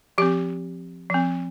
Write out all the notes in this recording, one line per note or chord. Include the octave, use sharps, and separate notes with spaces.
F3 C4 G4
F3 C4